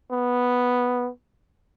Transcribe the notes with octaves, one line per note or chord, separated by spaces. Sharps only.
B3